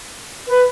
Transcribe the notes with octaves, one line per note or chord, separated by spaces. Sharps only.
B4